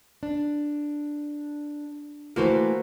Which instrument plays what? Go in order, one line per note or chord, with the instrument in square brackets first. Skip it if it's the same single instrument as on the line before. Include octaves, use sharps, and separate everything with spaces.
[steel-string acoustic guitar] D4
[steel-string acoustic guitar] E3 A3 B4 [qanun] A#3 F#4 C5